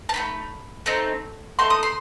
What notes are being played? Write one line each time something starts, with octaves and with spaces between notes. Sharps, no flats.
A5
A3 C4 D#4 B5
A3 C4 D#4
A3 D#4 A4 C6
D#6
C6